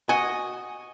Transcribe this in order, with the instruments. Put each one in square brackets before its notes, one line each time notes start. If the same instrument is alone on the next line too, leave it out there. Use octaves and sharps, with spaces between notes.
[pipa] F#4 D#5 [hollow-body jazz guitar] G#5